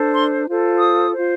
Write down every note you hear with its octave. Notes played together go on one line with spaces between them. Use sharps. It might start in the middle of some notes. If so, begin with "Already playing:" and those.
Already playing: D4 A4 C5
C6
F4 A4 C5
D#6
F4 C5